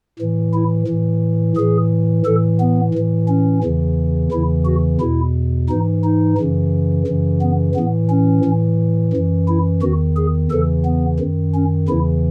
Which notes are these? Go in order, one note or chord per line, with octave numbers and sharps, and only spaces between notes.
A2 E3
E4
A2 E3
A2 E3 G#4
A2 E3 A4
B3
A2 E3
C#4
E2 C#3 E3
E2 C#3 E3 E4
F#4
E2 B2 E4
G#2 E3 D#4
D#4
F#2 C#3 E3
F#2 C#3 E3
B3
A2 E3 B3
C#4
A2 E3
F#2 E3
E4
E2 D#3 F#4
G#4
E2 C#3 E3 A4
B3
F#2 D#3
C#4
E2 C#3 E3 E4